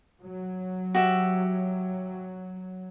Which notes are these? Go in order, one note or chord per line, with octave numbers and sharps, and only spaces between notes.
F#3
F#4 G4 E5